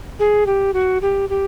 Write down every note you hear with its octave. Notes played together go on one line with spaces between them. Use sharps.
G#4
G4
F#4
G4
G4